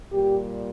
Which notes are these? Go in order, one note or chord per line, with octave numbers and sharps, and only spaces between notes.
A#2 G3 G4